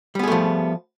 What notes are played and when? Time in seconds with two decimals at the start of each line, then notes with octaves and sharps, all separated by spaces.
0.15 G3
0.19 B3
0.23 G#4
0.27 A3
0.32 F3